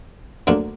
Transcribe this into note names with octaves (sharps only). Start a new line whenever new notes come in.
D2 D3 F#3 A#3 D4